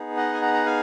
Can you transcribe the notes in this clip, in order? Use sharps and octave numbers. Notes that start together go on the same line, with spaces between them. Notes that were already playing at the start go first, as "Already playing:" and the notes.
Already playing: B3 D#4 G#4
D#5 F#5
G#5
F#5 A#5
A#5
F5 G#5